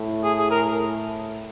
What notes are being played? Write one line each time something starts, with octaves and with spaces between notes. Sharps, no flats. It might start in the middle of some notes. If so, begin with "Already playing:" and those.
Already playing: A2
G#4
G#4
A#4